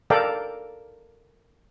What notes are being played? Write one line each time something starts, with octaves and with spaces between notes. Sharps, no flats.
A4 A#4 D5 F5 G5